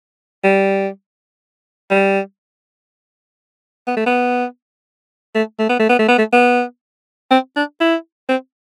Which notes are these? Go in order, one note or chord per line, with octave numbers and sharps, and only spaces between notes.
G3
G3
B3
A3
B3
A3
A3
B3
A3
B3
A3
B3
A3
B3
C4
D4
E4
C4